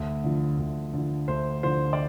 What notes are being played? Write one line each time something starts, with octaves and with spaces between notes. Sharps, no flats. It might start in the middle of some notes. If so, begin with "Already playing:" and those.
Already playing: D2
D3 F3
D2
D3 F3
D2 C5
D3 F3 C5
D5